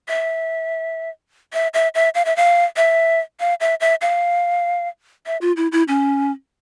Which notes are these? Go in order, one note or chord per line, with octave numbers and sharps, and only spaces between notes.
E5
E5
E5
E5
F5
E5
F5
E5
F5
E5
E5
F5
E5
F4
E4
E4
C#4